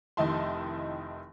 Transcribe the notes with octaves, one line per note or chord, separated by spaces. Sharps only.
F1 D#3 D#4 E4 A5 C6